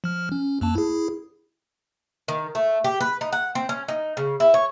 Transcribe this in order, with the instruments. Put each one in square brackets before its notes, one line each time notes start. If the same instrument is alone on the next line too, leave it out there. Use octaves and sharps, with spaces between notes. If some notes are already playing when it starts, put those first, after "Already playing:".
[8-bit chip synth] F3 F6
C#4
F2 A#3 A5
E4 G#4
[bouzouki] D#3
A3
G4
B4
D#4
F#5
C4
C#4
D#4
C#3
E4
C#5